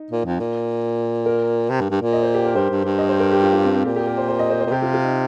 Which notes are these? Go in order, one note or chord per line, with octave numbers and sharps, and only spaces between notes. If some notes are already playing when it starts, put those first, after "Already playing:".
Already playing: D#4
A#2
F2
A#2
A#4
C3
G2
G2
A#2
D#5
C5
G4
A#4
G2 C5
G2
G2
D#5
C5
A#4
G4
F4
F4
C4
C4
A#2 G4
G4
A#4
C5
C5
D#5
C5
C5
A#2
C3 G4
F4
F4
D#4